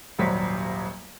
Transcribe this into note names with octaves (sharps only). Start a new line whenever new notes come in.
D#1 G#1 F#3 G3 C5 B6